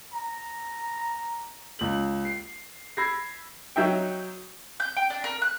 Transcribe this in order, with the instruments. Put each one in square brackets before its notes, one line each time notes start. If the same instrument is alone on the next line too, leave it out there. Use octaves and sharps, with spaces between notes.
[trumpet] A#5
[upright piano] C#2 F#7
C7
B5 E6 G#6 A#6 C7
[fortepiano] F#3 D#4 E5 G5
[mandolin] G6
G5
D4
A#4
F#6